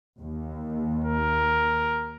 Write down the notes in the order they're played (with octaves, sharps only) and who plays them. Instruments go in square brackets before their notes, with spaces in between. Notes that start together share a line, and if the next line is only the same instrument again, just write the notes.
[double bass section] D#2
[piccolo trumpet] A#4